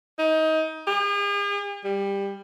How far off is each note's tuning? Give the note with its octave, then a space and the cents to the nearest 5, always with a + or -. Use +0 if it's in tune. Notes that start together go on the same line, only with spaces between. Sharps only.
D#4 +25
G#4 -45
G3 +15